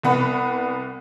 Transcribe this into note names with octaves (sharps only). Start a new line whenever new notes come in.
C2 B3 B5